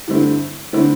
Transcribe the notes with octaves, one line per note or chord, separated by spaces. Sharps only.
G2 D3 A3 C4 E4
D3 A3 C4 E4